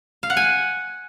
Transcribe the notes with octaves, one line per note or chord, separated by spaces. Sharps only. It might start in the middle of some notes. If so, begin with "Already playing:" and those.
F5
F#5
G#5